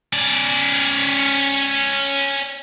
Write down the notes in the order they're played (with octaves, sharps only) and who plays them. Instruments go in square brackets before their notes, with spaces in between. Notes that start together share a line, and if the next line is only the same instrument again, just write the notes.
[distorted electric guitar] C#4 D5